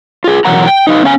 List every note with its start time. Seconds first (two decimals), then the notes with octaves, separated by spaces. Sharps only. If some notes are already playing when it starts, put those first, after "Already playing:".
0.24 F4 G#4
0.45 B2 E3 F#3 A#4 F#5 A#5
0.65 G5
0.87 D#4 B4 F5
1.03 B3 C#4 F5 G#5